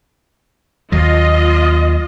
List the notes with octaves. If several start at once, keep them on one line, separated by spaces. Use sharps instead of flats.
D#2 F#3 F4 D#5